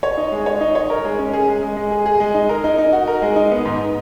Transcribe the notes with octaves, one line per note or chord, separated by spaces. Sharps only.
C#5
D#4
G#3
C#5
D#4
C#5
A#4
G#3
C#4
G#4
G#3
G#3
G#3
G#4
G#4
G#3
D#4
A#4
D#4
D#4
F#4
A#4
G#3
D#4
B3
G#2